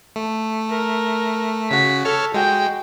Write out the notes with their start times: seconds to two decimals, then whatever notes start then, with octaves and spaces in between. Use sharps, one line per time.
0.16 A3
0.70 A#4
1.71 C#3 F#4 B6
2.05 A4 C#5 A5 F6
2.34 G#3 F#4 G5